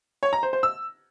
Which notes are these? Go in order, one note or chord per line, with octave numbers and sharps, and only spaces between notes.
C#5
A#5
C5
C5
E6